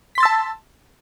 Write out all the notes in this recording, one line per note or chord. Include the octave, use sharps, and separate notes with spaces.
A5 C6 E6 A6 B6